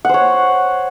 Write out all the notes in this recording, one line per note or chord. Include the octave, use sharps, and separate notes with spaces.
C5 C#5 F#5